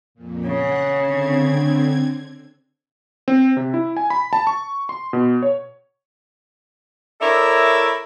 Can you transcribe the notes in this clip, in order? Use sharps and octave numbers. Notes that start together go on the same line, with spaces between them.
F2 A#2
C#3 F#5
D3 C4 G#6
C4
C3
E4
G#5
B5
A5
C#6
C6
B2
C#5
E4 A4 A#4 C#5 D5 E5